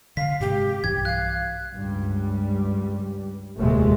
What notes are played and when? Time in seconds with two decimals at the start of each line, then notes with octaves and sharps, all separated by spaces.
0.17 D3 F5 B6
0.40 G#2 C3 G#3 G4
0.84 B1 G2 E3 G#6
1.05 F5 F#6
1.74 C#2 G2 G3
3.58 F1 D#2 A#2 G#3 A3